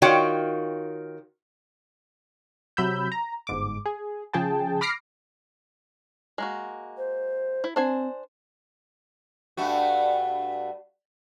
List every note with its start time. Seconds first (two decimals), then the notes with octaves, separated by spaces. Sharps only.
0.02 D#3 F4 F#4 C#5 F5 G5
2.77 C3 F#3 B5 E6 G6
3.12 A#5
3.47 G1 G#2 D6
3.86 G#4
4.33 C#3 F3 G#4 G5 A5
4.81 B5 D6 F6 A#6 C7 D7
6.38 G#3 A#3 F#4
6.97 C5
7.64 E4
7.76 C4 D4 C5 G#5
9.57 G2 A3 F#4